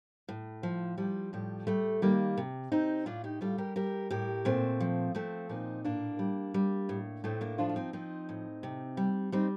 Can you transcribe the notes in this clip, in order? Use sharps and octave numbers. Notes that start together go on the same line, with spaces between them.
A2
F3
F3 G3
A2 G3
G3 A3
D#3 G3 A#3
C3
C3 C4 D#4
A2 D4 F4
D#4 G4
G3 F4 A4
G4 A#4
G3 G4 A#4
A2 G4 A#4
A#2 A3 C4
F3
F3 A3 C4
A#2 C4 D#4
A2 A#3 D4
G3
G3
A2
A2 A3 C4
A#3 D4
F3 D4 F4
F4
C4 D#4
F3 C4 D#4
A2
C3
G3
G3 C4 D#4